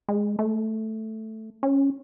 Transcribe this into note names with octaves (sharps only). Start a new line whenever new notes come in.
G#3
A3
C#4